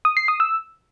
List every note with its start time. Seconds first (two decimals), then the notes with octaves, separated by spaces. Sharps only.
0.05 D#6
0.17 C7
0.28 D#6
0.40 E6